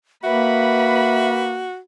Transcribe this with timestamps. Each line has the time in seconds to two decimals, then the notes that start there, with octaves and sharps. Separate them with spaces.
0.23 A#3 F#4 B4 E5 B5